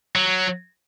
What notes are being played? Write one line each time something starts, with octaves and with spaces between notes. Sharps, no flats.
F#3